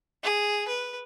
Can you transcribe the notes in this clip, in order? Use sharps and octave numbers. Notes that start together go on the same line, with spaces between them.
G#4
B4